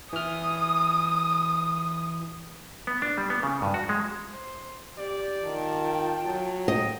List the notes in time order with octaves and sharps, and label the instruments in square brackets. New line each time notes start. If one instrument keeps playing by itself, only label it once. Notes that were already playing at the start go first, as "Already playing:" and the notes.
[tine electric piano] E3 F6 [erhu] D#6
[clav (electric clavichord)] B3
D4
G3
B3
C#3
G2
F#4
G#3
[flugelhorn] C5
[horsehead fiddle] G4 [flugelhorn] D5
[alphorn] D#3 [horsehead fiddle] F4 A5
[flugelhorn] G5
[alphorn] F#3
[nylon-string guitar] D#5 [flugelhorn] G5